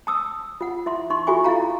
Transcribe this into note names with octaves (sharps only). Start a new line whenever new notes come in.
A5 D#6 E6
F4 F#5
E4 E5 C6
D#4 C6 C#6
F4 F#4 A4 E5 G#5 C#6
E4 F4 F5 A#5